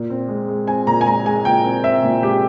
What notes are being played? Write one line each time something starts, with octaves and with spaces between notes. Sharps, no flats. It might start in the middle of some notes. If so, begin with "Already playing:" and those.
Already playing: A#2
C4
G#3
G#3
C4 G#5
A#2 A#5
G#5
G#3 A#5
G#3 G#5
A#2 G5
C4
C4 E5
A#2
G#3 G4